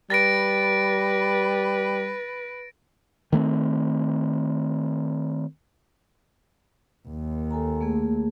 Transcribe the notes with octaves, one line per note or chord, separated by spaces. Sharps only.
G3 B4 A6 A#6 D7
D#3 A3 A#3 C4
D#2
A4 G#5 A#5
A3 A#3 G#4